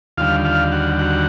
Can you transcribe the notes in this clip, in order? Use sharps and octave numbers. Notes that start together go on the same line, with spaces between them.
D#2 D3 G3 F4 F5
F4 F5
F#4 F#5
F#4 F#5